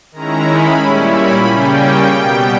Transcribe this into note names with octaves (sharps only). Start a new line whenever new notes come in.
D#3 G#3 C#4 E4 A#5
B5
A#2 G3 C#4 E4
B5
C#3 G3 A#3 C#4 G5
B2 G3 B3